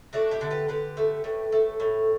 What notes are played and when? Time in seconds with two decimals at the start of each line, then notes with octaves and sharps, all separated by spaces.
0.13 A3 D4 F#4
0.31 E4 G4
0.41 D3
0.51 G4 B4
0.68 D3 G4 B4
0.97 A3
1.24 A2
1.52 A3
1.80 A2